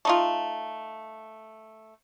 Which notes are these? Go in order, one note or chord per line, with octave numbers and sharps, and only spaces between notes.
A3 D#4 F4